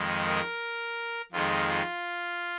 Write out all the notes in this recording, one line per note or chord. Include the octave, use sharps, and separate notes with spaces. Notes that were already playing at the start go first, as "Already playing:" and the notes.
Already playing: F2 D#3 G#3
A#4
F2 D#3 G#3 F4
F4